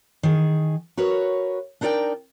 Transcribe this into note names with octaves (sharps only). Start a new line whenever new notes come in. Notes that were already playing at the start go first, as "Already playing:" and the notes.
D#3 G#4
F#4 A#4 B4 C#5
D4 D#4 A#4 D5 G5